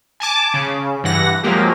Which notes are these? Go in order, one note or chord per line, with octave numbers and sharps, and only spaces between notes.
G#5 A5 D6
C#3
G2 E3 F#5 A#6
F3 F#3 G#3 A#3 G4